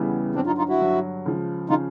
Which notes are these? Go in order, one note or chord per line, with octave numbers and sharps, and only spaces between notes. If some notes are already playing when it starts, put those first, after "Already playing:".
Already playing: E2 C#3 E3 G3 B3
G2 D3 F#3 C4 D4
D#4 F4
D#4 F4
E4 F#4
G2 D3 F#3
C#2 C#3 F3
C#3 F3 D#4 F4